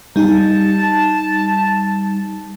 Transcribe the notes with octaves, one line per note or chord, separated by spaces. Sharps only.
G3 D#4 A5